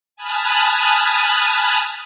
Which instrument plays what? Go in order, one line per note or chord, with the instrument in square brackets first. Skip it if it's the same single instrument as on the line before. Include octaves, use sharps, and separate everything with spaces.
[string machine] G#5 A5 B5 D#6 F6 F#6